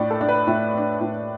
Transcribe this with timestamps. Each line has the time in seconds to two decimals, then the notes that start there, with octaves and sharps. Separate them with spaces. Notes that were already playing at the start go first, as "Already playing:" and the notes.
Already playing: A2 A3 D4 D5
0.11 A4
0.21 A3 D4
0.29 B4
0.47 A2 E5
0.73 A3 D4
1.01 A2